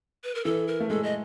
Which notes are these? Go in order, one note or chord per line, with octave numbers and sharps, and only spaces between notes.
B4
A#4
E3 A4
A#4
A3
G#3 A4
D#5